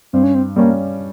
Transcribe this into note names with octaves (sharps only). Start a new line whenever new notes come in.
G2 C4
C#4
C4
G3 A#3 C#4